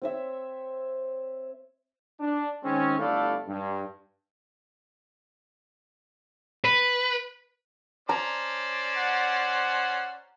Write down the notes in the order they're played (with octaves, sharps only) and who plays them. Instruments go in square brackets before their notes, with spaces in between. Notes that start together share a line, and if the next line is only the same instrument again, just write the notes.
[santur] C4 C#5 E5
[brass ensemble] D4
D#3 G#3 C4 C#4
G1 A3 E4 A4 D5 F5
G2
[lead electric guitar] B4
[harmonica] C#4 C5 D5 [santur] A#5
[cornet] F#5